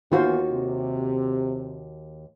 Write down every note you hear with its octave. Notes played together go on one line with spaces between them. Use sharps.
D#2 D#3 E3 B3 F4 F#4 C5
C3